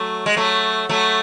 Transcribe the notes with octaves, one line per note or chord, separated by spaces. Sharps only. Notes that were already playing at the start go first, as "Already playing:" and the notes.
Already playing: F#3 A3
G#3
F#3 A3
F#3 A3